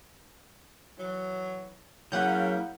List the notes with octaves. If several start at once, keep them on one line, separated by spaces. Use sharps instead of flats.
E3 F#3
C#3 F#3 A#3 E4 F#5 G6